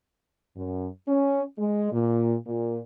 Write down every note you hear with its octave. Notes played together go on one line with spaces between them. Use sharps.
F#2
C#4
G#3
A#2
A#2